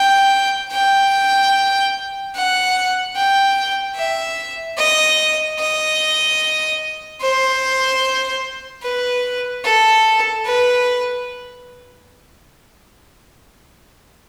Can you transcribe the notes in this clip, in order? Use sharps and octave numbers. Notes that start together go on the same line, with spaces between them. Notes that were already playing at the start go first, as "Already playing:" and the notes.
Already playing: G5
G5
F#5
G5
E5
D#5
D#5
C5
B4
A4
B4